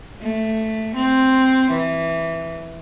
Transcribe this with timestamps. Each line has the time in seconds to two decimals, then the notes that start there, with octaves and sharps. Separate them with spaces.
0.21 A3
0.95 C4
1.71 E3